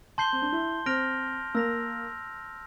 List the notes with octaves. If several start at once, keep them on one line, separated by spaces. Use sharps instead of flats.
A5 C6 G6 C7 G7
C4
D4
E4
C4 F6 A#6 D7 F7
A#3 E6 A#6 F7